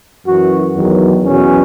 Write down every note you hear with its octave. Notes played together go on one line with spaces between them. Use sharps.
F#2 E3 F#4
E2 D#3 F#3
E2 B2 F#3 C#4